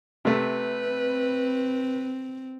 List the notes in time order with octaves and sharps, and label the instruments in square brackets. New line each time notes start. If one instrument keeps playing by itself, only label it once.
[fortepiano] C3 A3 [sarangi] B4
[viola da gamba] C4